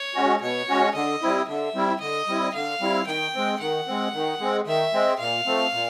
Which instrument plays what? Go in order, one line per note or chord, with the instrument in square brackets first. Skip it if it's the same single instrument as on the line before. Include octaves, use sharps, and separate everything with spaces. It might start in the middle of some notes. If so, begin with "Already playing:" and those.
Already playing: [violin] C#5
[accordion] G#3 C#4 F#4
[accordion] B2 [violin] C#5
[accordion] G#3 C#4 F#4
[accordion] D3 [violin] D#5
[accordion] G3 C4 E4
[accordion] D3 [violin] E5
[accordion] G3 C4 E4
[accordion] D3 [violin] D#5
[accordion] G3 C4 E4
[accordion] D3 [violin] F5
[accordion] G3 C4 E4
[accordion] D#3 [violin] G5
[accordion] G#3 C4
[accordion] D#3 [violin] F#5
[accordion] G#3 C4
D#3
G#3 C4
[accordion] D#3 [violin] E5
[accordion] G#3 C4
[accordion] A#2 [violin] F5
[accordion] F3 A3 C4
A#2